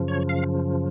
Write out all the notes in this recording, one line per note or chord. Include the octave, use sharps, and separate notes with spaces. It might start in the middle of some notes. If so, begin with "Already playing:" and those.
Already playing: F#2 C#3 F3
C#5
F5